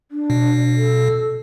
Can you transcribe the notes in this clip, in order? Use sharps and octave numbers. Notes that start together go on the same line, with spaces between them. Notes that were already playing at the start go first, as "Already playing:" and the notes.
D4
B2
A4